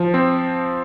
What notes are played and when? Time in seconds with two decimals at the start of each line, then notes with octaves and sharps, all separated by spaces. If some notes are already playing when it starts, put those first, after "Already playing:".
Already playing: F3
0.14 C4